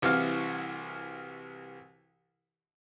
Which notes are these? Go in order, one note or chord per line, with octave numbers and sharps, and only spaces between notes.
C2 C3 E3 F#4 F5 F6